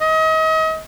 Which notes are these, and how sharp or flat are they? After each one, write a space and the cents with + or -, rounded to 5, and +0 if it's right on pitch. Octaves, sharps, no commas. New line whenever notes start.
D#5 +35